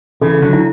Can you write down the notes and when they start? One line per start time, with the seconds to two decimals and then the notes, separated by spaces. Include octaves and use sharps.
0.21 C#3 E3 A4
0.42 D3 F#3
0.53 E4